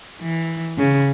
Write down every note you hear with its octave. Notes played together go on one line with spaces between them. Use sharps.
E3
C#3